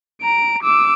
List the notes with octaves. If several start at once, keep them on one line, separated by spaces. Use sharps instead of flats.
A#5 D7
D6 E6